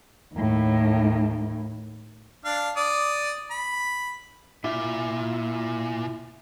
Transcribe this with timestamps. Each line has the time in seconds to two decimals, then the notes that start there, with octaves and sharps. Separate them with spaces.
0.35 D#2 A2
2.45 D4 F5
2.77 D5 D#6
3.51 B5
4.64 A#2 E4 F4